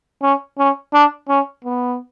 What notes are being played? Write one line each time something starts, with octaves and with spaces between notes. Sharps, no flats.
C#4
C#4
D4
C#4
B3